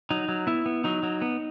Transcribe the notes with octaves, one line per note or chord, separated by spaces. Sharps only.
F#3 D#4
F#3
B3 E4
B3
F#3 D#4
F#3
B3